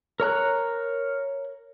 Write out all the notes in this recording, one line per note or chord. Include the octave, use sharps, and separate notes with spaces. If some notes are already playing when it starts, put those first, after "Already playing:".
A#4 C#5 A#5 F#6